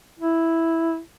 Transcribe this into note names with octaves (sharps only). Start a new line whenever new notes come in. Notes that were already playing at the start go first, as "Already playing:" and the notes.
E4